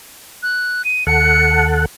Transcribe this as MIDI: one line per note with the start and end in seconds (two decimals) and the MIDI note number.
0.43 0.85 90
0.85 1.07 99
1.07 1.86 39
1.07 1.86 69
1.07 1.86 78
1.07 1.66 97